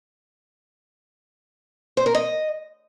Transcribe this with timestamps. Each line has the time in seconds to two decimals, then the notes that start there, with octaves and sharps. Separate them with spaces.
1.97 C5
2.06 A#4
2.15 D#5